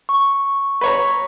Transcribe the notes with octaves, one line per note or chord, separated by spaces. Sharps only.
C#6
B4 C#5 A#5